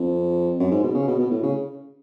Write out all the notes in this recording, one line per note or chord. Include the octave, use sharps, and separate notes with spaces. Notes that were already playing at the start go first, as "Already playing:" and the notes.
Already playing: F2
F#2
G#2
B2
C#3
B2
B2
A2
C#3